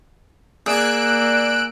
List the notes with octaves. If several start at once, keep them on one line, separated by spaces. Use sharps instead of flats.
A#3 G#4 D5 E6 F#6 D7